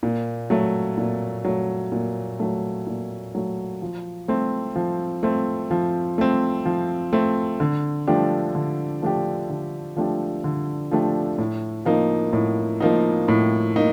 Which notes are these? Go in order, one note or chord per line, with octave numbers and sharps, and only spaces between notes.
A#2
F#3 A3
A#2
F#3 A3
A#2
F#3 A3
A#2
F#3 A3
F3
A3 C4
F3
A3 C4
F3
A3 C4
F3
A3 C4
D3
F3 A3 D4 G4
D3
F3 A3 D4 G4
D3
F3 A3 D4 G4
D3
F3 A3 D4 G4
A2
F3 A#3 D#4
A2
F3 A#3 D#4
A2
A#3 D#4